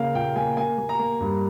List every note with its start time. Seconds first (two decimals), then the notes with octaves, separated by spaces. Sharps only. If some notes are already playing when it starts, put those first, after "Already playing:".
Already playing: C#3 A#3 F5
0.15 A#2 G5
0.36 A#3 G#5
0.57 A#3 G#5
0.78 A#3
0.89 A#5
0.99 A#3
1.20 G2